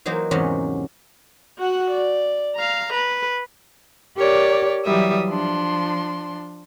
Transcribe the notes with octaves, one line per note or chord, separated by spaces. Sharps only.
E3 F#3 A#3 D#4 C5
E2 G#2 C3 F#3 C#4
F#4 F#5
D5
F5 A#5
B4
G4 A#4 C#5 D5
E3 F#3 G3 E5 D#6
F3 D4 C6